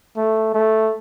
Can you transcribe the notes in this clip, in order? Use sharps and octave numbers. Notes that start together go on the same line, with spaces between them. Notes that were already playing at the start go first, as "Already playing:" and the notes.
A3
A3